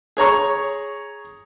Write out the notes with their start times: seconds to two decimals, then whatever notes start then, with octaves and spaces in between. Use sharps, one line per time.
0.17 G#4 C#5 A#5 C#6